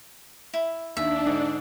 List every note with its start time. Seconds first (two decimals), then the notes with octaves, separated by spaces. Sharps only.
0.54 E4
0.97 D#2 D4 E5
1.26 G#2 D3 D#4